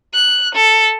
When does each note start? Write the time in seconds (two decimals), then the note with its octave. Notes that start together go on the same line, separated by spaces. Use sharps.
0.14 F#6
0.55 A4